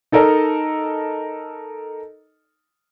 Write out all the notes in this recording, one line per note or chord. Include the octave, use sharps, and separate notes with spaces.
D#4 A4 A#4 D#5